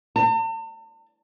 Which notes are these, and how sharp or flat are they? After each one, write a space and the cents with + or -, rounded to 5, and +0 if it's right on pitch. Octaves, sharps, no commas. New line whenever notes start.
A5 +45